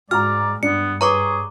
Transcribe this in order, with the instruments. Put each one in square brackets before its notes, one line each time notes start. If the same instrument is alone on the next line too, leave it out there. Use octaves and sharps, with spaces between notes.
[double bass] G#2 G#3 [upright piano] F#4 A#5 [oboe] D5 [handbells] F6
[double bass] G2 [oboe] B3 [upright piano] D4 [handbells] C#7
[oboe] G#4 [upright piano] B4 C#5 [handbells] A#5 C#6 D6